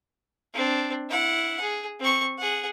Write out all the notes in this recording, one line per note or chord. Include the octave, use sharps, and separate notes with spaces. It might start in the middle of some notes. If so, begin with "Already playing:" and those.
C4 D4
E4 F#5
G#4
C4 C#6
G#4 F#5